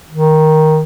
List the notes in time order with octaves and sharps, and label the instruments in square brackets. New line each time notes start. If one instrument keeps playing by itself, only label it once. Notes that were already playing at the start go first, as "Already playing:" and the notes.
[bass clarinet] D#3